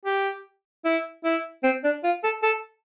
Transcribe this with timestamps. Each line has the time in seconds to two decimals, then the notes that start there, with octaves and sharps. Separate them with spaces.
0.05 G4
0.85 E4
1.24 E4
1.64 C4
1.84 D4
2.04 F4
2.24 A4
2.43 A4